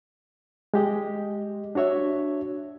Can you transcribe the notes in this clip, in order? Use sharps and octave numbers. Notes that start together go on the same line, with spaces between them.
G#3 G4 D#5
D4 F#4 C#5 E5